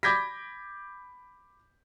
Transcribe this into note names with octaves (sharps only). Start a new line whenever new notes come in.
B5 D6 G6 G#6 A#6 B6